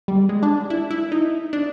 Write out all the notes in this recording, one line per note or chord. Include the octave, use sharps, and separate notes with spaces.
G3
G#3
D4
E4
E4
D#4
D4